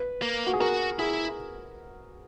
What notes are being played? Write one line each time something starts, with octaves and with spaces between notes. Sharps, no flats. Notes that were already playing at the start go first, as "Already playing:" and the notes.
Already playing: B4
A#3
F#4
G#4
F#4 A#4
E4 G#4